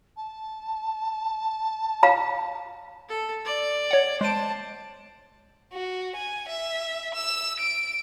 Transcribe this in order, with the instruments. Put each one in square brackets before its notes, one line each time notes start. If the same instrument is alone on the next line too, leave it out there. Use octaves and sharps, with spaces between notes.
[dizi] A5
[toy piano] F5 A#5
[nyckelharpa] A4
D5
[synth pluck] C#5 F#5
[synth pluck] G#3 D7 [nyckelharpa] C5 A5
[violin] F#4
G#5
E5
E6
D7